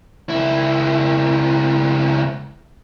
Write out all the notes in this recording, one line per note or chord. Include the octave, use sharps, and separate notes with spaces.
C#2 E4